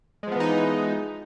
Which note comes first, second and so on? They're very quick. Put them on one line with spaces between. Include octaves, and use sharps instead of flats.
G#3 F3 B3 E3 D#4